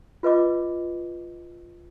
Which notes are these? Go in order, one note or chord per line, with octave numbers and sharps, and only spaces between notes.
F4 B4 D#5 D6